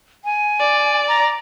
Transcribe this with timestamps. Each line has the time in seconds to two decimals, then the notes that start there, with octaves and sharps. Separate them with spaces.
0.25 G#5
0.60 D5
1.08 A#5